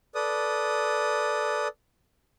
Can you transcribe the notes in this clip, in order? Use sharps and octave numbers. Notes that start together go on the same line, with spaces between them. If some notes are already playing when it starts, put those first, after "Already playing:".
A4 B4 D5 D#6